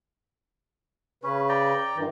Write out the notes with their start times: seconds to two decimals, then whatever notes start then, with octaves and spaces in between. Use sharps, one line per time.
1.23 C#3 C#4 B4
1.49 D5 G5 A#5
1.96 G2 D#3 E3